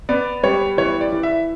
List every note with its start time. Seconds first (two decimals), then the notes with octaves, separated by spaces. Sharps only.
0.09 B3 D5
0.43 G3 C#5
0.78 E3 C#5
1.01 D5
1.12 E3
1.23 E5